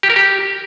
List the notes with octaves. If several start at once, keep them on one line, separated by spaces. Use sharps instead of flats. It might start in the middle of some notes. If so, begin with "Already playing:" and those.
G4
A#4
G4